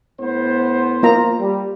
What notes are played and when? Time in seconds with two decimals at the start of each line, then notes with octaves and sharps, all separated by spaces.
0.21 A2 B3 C5
1.03 A#3 F4 A#5
1.40 G3